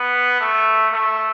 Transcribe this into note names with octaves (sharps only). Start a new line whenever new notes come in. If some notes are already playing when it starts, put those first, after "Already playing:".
Already playing: B3
A3
A3